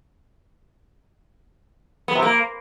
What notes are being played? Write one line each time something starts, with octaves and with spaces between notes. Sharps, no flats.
B3
C3
A#3